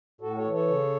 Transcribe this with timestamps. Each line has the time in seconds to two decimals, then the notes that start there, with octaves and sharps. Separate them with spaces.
0.21 A2 F#4 A4
0.37 A4 C#5
0.44 E3
0.53 A4 C#5
0.68 C#3